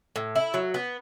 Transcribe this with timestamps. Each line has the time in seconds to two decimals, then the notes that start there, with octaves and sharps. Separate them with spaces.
0.16 A2
0.36 E4
0.54 F#3
0.74 B3